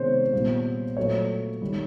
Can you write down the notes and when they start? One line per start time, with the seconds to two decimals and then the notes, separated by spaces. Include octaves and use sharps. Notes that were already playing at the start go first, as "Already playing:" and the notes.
Already playing: C3 D#3 G#3 B3 C5 C#5
0.33 A#2 G3 B3
0.97 A#2 F#3 A3 C#5
1.62 D#3 G3